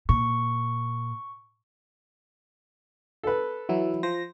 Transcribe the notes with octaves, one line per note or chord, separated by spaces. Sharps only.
A#2 C#6
A4 B4
E3 F#3 E4
F3 C5 A#6